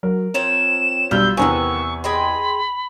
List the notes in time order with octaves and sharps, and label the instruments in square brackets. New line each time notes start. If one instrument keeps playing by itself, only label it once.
[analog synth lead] F#3 [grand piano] A#4
[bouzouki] F3 C#5 A#5 [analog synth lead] C4 [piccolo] E7
[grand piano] B1 G3 F6 [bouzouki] F4 [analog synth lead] E6 [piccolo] G6
[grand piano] E2 C3 G#5 [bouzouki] D#3 A#3 B3 [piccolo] C#6
[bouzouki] G#4 D#5 G5 [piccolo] B5 [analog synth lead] C6